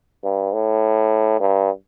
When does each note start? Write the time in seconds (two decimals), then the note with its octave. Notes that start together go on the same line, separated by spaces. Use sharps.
0.23 G2
0.53 A2
1.40 G2